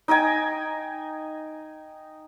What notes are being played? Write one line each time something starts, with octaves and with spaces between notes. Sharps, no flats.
D#4 D#5 G5 G#5